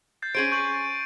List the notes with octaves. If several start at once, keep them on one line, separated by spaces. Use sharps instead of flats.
G6 A6 C7
C#4 G#4 C5 D7 D#7
C#6 G6 F#7
A6